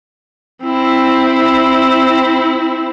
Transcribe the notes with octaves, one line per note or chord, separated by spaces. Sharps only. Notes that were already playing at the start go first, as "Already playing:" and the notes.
C4 E4